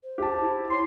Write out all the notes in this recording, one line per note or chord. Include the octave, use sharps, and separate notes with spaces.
C5
G4 A5
E4
C#5 C6